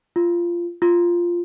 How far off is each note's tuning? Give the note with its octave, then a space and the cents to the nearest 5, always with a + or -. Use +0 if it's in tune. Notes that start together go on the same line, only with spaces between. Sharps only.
F4 -15
F4 -5